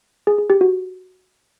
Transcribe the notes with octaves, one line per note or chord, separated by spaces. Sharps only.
G#4
G#4
G4
F#4